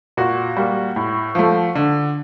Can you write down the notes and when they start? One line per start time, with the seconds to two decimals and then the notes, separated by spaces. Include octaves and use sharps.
0.17 A#2 F#4
0.57 G3 A#3
0.96 A2
1.35 F3 A3
1.75 D3